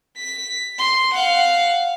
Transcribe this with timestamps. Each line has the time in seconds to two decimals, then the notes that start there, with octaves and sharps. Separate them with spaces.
0.17 B6
0.79 C6
1.14 F5 F#5